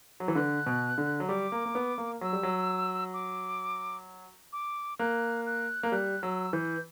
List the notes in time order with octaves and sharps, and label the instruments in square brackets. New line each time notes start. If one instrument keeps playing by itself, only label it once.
[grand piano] F#3
E3
[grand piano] D3 [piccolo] F#6
[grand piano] B2
D3
F#3
[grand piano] G3 [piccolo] D6
[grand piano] A#3
A#3
B3
A#3
[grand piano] F#3 [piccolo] E6
[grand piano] G3
F#3
[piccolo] D6
D6
[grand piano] A#3 [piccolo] F#6
[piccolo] F#6
[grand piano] A#3
[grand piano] G3 [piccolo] F#6
[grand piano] F#3 [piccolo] E6
[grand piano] E3 [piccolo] G6